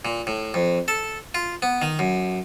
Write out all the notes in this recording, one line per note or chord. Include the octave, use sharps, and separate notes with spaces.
A#2
A2
F2
A4
F4
B3
D#3
F#2